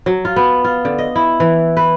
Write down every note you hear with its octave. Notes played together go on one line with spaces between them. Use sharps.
F#3
F4
B3
F4
D3
D#5
E4
E3
B4